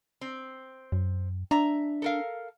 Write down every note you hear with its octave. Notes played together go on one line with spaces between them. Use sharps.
C4
F#2
D4 E5 A#5
A4 A#4 F5